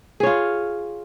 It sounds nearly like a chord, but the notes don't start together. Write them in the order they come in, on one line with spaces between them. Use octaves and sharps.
G#4 C#5 F4